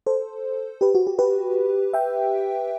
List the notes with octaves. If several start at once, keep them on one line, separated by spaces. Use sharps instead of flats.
A4 C5
G4 B4
F#4
G4
G4 B4
E5 G5